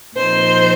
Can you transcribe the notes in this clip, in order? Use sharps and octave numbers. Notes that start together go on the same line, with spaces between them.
A#2 F3 C4 D#4 C5